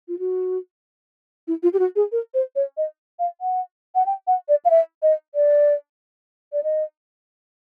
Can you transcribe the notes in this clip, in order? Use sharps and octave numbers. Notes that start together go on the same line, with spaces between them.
F4
F#4
E4
F4
G4
F#4
G#4
A#4
C5
C#5
D#5
F5
F#5
F#5
G5
F#5
D5
F5
E5
D#5
D5
D5
D#5